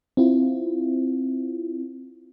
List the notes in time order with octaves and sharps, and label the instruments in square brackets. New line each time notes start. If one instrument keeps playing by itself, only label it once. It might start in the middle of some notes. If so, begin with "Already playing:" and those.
[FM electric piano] C4 E4 F4